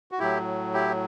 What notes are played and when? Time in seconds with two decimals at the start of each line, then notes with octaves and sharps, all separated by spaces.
0.12 F#4
0.19 A2 F#3 E4 G4
0.74 E4 G4